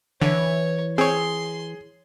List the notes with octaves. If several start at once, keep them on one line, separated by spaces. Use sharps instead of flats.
D3 E3 C#5
C4 G#4 C#5 C6